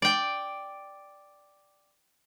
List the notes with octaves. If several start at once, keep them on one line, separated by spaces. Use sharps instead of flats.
D5 G5